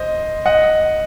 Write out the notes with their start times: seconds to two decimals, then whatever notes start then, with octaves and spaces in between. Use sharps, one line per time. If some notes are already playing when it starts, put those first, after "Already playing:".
Already playing: C5 D#5
0.46 D#5 F#5